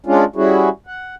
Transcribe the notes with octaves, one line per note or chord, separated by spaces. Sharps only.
G#3 C#4 D4 F4
G3 C#4 E4 F#4 G#4
F#5